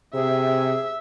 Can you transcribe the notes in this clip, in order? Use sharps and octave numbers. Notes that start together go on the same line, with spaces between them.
C3 G#4 E5